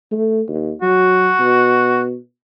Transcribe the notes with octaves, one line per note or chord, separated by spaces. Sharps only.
A3
D#2
F#3 F#4
B2